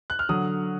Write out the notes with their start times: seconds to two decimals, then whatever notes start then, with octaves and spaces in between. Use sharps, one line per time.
0.10 F#6
0.19 F6
0.29 D3 F#3 D#6